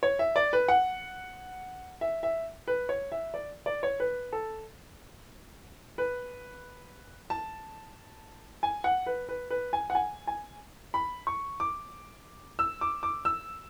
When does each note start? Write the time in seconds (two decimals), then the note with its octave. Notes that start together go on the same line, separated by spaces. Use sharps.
0.03 C#5
0.19 E5
0.36 D5
0.53 B4
0.68 F#5
2.01 E5
2.23 E5
2.68 B4
2.89 C#5
3.12 E5
3.34 D5
3.66 D5
3.83 C#5
4.00 B4
4.33 A4
5.98 B4
7.30 A5
8.63 G#5
8.84 F#5
9.06 B4
9.29 B4
9.50 B4
9.73 G#5
9.90 F#5
9.95 G#5
10.27 G#5
10.94 B5
11.27 C#6
11.60 D6
12.59 E6
12.81 D6
13.03 D6
13.25 E6